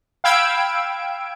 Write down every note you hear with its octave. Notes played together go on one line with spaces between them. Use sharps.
F5 G5 B5 E6 G#6 D7